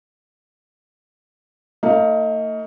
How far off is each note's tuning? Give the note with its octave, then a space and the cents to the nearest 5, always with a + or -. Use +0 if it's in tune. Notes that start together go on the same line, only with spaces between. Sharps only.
A3 +45 D#4 +25 F5 +0